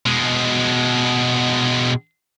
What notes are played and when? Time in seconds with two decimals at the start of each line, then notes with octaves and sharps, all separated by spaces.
0.06 B2 G#3